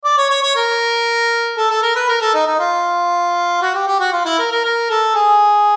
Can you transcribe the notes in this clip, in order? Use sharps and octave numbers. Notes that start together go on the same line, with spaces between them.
D5
C#5
C#5
C#5
A#4
A4
A4
A#4
B4
A#4
A4
D#4
D#4
F4
F#4
G4
G4
F#4
F4
E4
A#4
A#4
A#4
A4
G#4